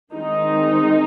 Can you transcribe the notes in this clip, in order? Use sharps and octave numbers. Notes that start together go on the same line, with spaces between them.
D#3 G#3 C4 D#4